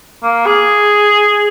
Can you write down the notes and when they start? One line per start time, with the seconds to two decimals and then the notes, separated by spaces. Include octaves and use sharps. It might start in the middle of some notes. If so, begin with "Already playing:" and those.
0.23 A#3
0.46 G#4